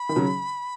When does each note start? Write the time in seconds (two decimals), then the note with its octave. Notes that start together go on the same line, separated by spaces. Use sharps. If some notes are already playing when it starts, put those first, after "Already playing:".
Already playing: B5
0.09 D#3
0.16 C#3 F#3